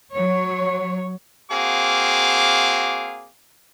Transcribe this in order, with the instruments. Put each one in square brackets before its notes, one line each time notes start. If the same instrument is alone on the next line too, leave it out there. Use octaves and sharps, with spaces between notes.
[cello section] F#3 C#5
[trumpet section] A#3 C4 F#4 G#4 F5 D6